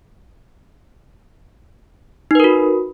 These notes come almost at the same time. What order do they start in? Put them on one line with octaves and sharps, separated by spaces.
D#4 B4 A#4 F#4